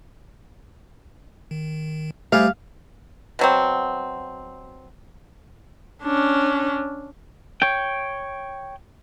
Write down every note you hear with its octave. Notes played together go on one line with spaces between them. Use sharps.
D#3
G3 A3 G#4 C5 E5 F5
B2 F#3 C4
C#4 D4
C#5 G5